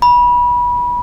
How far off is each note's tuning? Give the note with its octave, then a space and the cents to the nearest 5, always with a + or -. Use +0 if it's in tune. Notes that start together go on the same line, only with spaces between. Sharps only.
B5 -25